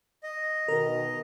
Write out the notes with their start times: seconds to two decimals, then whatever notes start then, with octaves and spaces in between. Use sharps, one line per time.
0.23 D#5
0.68 B2 D#3 A#4